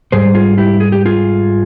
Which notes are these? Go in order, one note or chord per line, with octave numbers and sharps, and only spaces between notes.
G#2 G3 G#4 C5
F4 G#4
E4 G4
G#4
G4
F4 G#4